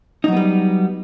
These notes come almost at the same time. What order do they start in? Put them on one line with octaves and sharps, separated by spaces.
D#4 F#3 B3 G3